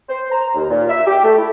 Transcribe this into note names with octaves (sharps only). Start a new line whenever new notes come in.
C5
A#5
D#2
A#2
E5
G4
A3
E4